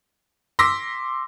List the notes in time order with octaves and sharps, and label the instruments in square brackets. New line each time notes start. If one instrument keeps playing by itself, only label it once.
[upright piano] C6 D6 E6 A#6 B6